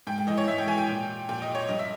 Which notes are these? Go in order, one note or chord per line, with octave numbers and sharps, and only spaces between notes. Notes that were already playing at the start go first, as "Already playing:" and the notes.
G#2 G5
G5
E3 D#5
C#5
G#2 E5
G5
E3 G#5
G5
A#2
A#2 G5
D#5
C#5
G2 D#5
E5